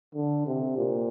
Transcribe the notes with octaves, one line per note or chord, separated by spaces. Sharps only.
D3
C3
A#2